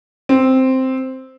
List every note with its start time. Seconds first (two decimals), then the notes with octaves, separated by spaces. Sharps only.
0.29 C4